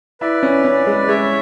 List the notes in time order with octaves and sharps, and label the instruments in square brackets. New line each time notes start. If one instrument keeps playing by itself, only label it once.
[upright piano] E4 [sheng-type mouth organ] B4 D5
[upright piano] C#4
C#4
G#3
[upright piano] G#3 [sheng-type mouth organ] C#5 E5